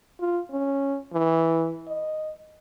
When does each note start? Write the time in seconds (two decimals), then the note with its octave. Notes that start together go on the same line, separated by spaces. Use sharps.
0.21 F4
0.51 C#4
1.14 E3
1.88 D#5